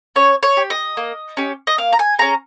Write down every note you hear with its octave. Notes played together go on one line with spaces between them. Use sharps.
C#4 C#5
C#5
G4
D#5
A#3
C#4 G4
D#5
A#3 F5
A#5
G#5
C#4 G#4 A#5